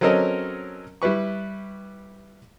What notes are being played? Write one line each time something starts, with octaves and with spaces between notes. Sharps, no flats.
F#3 C4 C#4 A4 A#4 D#5
G3 E4 B4 C#6